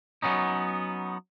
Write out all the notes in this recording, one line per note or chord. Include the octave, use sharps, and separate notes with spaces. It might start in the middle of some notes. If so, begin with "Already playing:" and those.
F#3 B3 C#4 D#4